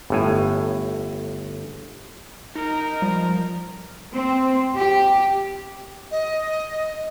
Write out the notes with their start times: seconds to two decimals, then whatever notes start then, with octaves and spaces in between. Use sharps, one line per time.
0.10 G1 A2 G#5
2.55 D#4 A#4
3.02 F3 G3
4.12 C4
4.77 G4
6.11 D#5